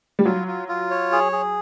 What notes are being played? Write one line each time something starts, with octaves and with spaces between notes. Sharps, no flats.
G3
F#3 F4
F4
F4
C#5
G#4
G#4